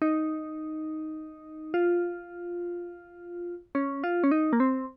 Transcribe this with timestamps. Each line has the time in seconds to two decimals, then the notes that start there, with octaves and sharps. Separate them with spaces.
0.02 D#4
1.74 F4
3.75 C#4
4.04 F4
4.24 C#4
4.31 D#4
4.53 A#3
4.60 C4